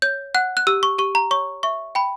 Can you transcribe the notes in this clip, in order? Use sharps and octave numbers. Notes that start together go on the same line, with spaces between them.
C#5 G6
F#5 F#6
F#6
G4 E6
C#6
G4 C#6
A#5
C#5 C#6
E5 C#6
G5 B5